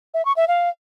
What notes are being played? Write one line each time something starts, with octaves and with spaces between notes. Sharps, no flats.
E5
C#6
E5
F5